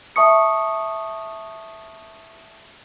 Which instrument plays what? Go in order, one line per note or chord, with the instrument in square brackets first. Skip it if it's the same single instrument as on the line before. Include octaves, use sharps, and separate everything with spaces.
[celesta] E5 A5 C#6 D#6 C#7